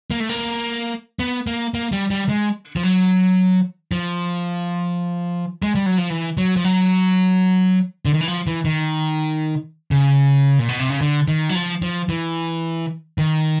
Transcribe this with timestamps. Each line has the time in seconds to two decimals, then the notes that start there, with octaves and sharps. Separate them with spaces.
0.11 A#3
0.20 A3
0.29 A#3
1.19 B3
1.47 A#3
1.74 A#3
1.92 G3
2.10 G3
2.29 G#3
2.76 F3
2.83 F#3
3.92 F3
5.62 G#3
5.75 G3
5.86 F#3
5.98 F3
6.10 E3
6.37 F#3
6.56 F3
6.64 F#3
8.05 D3
8.14 D#3
8.21 E3
8.28 F3
8.47 E3
8.65 D#3
9.91 C#3
10.59 A#2
10.69 B2
10.80 C3
10.89 C#3
11.01 D3
11.28 D#3
11.49 F#3
11.55 F3
11.82 F3
12.09 E3
13.18 D#3